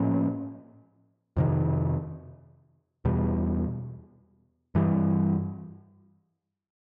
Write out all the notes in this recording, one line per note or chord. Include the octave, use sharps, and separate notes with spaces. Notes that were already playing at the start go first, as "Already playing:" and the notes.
Already playing: A2 F3 A#3 C#4
F2 C3 D#3
E2 B2 G3
G2 E3 G3